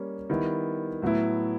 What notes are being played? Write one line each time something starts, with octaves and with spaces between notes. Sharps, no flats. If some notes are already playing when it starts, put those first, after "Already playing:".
Already playing: G3 A#3 C#4
D#3 G3 B3 E4
A2 F#3 B3 E4